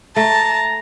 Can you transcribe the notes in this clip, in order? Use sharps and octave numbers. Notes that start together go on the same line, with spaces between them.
A3 A5 A#5